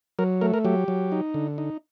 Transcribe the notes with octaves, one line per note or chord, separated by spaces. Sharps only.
F#3 A#4
A3 A#4
A#4
F#3 G4
F#3
D#4
D3
D#4